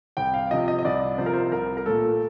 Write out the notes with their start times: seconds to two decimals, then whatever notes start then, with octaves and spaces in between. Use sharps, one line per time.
0.17 C2 G5
0.34 F5
0.51 C3 F3 D#5
0.68 D#5
0.79 D#5
0.85 C2 D5
1.18 C3 F3 C5
1.26 A#4
1.34 C5
1.52 C2 A#4
1.77 A#4
1.86 A#2 A3 A4